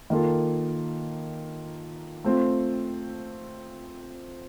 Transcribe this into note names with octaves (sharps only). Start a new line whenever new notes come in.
D#3 A#3 F4 A4
A3 C4 F4